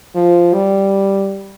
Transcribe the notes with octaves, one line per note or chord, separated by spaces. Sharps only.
F3
G3